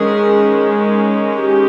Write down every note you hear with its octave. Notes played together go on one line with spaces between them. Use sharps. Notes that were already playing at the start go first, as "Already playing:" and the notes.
Already playing: D#3 G#3 C#4 G#4
G4